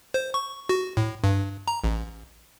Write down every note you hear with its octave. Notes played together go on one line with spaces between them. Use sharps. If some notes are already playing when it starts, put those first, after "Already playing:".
C5
C#6
F#4
A2
G2
A#5
A1